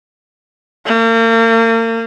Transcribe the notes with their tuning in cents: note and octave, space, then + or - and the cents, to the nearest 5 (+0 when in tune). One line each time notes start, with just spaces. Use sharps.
A#3 -40